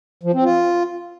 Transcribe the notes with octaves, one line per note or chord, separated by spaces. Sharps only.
F3
C4
F4